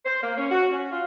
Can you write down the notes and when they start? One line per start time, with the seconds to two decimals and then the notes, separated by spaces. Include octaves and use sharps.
0.04 C5
0.22 A#3
0.37 C#4
0.51 F#4
0.71 C#4
0.91 F4